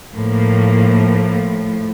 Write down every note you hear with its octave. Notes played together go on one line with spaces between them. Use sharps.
A2 F3 A#3